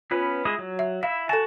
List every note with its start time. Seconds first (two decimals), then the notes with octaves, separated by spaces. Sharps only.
0.11 B3 C#4 F4 B4
0.45 G#3 E4 D#6
0.59 F#3
0.79 E5
1.03 E4 E5 F5
1.29 F#4 A4 G#5 A5